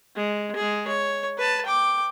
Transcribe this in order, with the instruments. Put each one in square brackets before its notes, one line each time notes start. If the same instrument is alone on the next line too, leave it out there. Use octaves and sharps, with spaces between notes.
[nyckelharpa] G#3
G#3 G#4
C#5
B4 A5
G5 D6